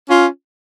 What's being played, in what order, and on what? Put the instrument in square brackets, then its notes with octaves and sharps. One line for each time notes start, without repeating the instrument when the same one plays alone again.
[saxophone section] C#4 F4